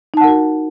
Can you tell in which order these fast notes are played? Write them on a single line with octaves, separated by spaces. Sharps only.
D#4 A5 F#5 A#4 F#4